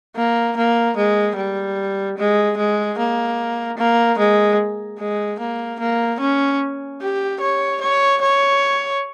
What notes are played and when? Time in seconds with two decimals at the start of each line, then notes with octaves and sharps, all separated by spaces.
0.16 A#3
0.57 A#3
0.97 G#3
1.36 G3
2.18 G#3
2.58 G#3
2.98 A#3
3.78 A#3
4.19 G#3
4.99 G#3
5.39 A#3
5.80 A#3
6.20 C#4
7.01 G4
7.41 C#5
7.81 C#5
8.21 C#5